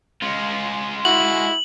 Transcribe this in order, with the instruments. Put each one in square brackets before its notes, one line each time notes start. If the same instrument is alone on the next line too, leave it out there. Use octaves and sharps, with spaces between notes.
[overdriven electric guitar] G#3 F4
[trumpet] E4 [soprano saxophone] F#4 [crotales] F#7